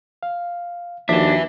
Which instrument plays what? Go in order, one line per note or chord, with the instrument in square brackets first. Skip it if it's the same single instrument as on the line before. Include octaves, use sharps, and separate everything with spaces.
[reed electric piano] F5
[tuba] D#2 [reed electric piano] F3 F#4 [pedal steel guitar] D4 [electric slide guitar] B4 E5